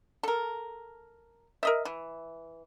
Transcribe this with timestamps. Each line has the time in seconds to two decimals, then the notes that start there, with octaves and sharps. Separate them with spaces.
0.23 A4 A#4
1.63 A#4 D#5 E5
1.85 E3